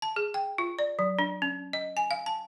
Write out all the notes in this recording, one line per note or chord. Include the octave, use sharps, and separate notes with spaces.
A5
G#4
G5
F4
D5
F#3
D4
C#4
D#5
G#5
F5
A5